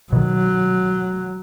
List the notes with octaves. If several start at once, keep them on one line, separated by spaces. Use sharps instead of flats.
B2 D#3 F#3